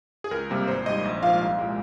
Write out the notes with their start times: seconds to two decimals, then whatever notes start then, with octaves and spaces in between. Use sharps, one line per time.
0.24 G#4
0.31 C#2 A#4
0.50 C3 G3 A#3
0.67 G#1 C5
0.86 G#2 G3 D#5
1.04 A#1
1.22 G#2 F3 A#3 F5
1.41 C2
1.58 A#2 G#3